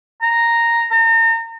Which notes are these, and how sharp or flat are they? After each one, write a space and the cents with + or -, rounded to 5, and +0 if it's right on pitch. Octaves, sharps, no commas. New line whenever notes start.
A#5 -5
A#5 -35